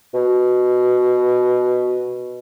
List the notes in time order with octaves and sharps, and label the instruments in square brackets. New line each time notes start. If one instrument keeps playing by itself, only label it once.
[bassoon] B2